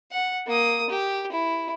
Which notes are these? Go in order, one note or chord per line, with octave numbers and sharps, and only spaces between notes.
F#5
A#3 D#6
G4
E4